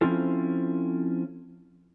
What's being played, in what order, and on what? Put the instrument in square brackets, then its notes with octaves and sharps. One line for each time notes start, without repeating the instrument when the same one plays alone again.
[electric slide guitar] F3 C4 C#4 E4 F4 A4